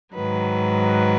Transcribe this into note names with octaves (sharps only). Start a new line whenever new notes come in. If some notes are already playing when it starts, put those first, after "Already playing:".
G#2 D#3 F#3 B4